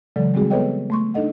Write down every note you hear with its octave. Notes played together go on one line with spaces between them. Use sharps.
C#3 E3 F#3 G#3 A4 D5
G3 G#3 C4 F#4 G#4
B3 A4 B4 C#5 D#5 G5
A3 C6 C#6
D4 D#4 A4 D#5 F#5